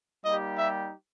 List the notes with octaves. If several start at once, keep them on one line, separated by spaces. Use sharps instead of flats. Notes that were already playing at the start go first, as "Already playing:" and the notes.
G3 A#3 D#4 G4 D#5
E5